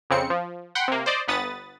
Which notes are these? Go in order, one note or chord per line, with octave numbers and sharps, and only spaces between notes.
F2 C#3 C4 C#7
F3
F#5 G5 B5 C6
C3 A#3
C5 D5 D#5
G1 B3 B4 D#6 A6